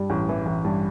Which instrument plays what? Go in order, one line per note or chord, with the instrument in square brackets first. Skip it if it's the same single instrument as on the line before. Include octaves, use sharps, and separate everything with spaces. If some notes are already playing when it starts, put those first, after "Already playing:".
Already playing: [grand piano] G2 G3
A1
E3
A1
G2